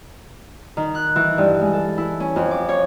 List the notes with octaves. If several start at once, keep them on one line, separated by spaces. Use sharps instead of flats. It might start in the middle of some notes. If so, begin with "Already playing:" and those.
D#3
F#6
E3
G2
G#3
A4
E4
C#4
F2
D6
C#5